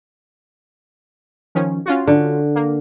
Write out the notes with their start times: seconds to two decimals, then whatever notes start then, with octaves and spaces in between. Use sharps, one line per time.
1.55 D#3 F3 C#4
1.86 C#4 F4 F#4
2.07 D3
2.55 A#3